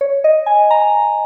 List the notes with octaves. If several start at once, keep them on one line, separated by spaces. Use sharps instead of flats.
C#5
D#5
G#5
A#5